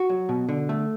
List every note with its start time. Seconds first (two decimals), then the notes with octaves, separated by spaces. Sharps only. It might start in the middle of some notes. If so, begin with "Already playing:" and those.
Already playing: F#4
0.10 F#3
0.29 B2
0.49 D3
0.69 A3